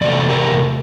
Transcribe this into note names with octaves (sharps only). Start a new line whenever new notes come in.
E2 C3 A3 D5
G4 A#4